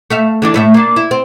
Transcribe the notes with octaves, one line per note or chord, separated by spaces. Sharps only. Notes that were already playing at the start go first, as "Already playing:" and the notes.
A3 E5 F5
D3 E3 D4
A2 A3 E5
A#3 D4
E4
C4